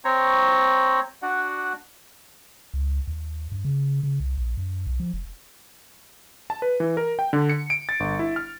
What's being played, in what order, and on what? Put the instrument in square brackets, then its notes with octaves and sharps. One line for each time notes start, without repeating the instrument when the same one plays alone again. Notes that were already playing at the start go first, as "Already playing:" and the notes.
[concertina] C4 C5 C#5 A#5 C#6
D4 F#4 D5 F#5
[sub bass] C#2
D#2
G2
C#3
C#3
C2
A#1
F#2
B1
F3
F1
[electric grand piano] A5
B4
E3
A#4
G5
D3
C#7
D7
A6
G1
E4
F6